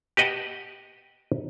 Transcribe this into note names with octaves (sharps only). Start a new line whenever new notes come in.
G4 B4 D#5 F#5 G5 A5